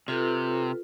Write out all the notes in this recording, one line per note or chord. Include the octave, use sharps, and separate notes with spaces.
C3 F4 A4 B4